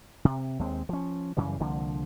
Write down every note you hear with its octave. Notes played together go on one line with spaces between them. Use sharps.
C3
D#2 G#3 C4
F3 C#4
F#2 C#3 E3 G3
C2 D3 F3 A#3